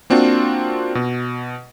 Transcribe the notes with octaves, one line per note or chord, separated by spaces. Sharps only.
A#3 C4 D4 F4 F#4
B2